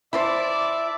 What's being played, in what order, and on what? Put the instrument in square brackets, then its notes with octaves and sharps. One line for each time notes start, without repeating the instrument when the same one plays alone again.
[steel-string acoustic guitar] E4 [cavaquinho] C5 A5 B5 [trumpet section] D5 [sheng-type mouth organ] E5